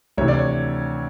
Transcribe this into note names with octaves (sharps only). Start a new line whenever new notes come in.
D2 C3 E3 C#5
D5
C#5